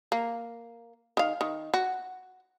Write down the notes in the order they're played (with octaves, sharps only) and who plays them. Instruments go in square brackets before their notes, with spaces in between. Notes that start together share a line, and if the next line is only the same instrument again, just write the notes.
[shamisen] A#3
D#3 F5
D#3
F#4